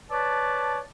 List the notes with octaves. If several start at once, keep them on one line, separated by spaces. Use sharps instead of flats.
B4 C#5 D5 A5